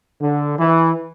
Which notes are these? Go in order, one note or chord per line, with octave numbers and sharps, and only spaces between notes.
D3
E3